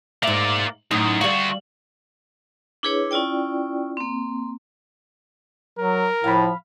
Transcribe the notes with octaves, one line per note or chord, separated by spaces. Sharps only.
G#2 A#3 D5 E5
F#2 A2 D#4
D2 G3 F#4 F5
D4 E4 G#4 B4 C#5
C#4 E4 F4 D5 G5
A#3 C4
F#3 A#4
A2 F3 F5 B5